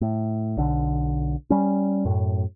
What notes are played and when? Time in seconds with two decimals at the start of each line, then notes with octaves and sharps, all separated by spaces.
0.01 A2
0.57 B1 D3
1.50 G3 C#4
2.05 F#2 A2